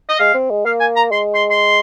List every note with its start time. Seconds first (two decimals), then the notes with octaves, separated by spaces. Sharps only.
0.09 D#5
0.19 G#3 F5
0.34 C4
0.50 G#3
0.65 A#3 F5
0.80 G#5
0.96 A#5
1.12 G#3 C6
1.34 C6
1.50 C6